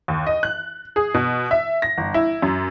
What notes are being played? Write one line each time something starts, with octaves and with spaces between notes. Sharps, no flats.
D#2
D#5
F#6
G#4
B2
E5
A#6
G1
E4
F#2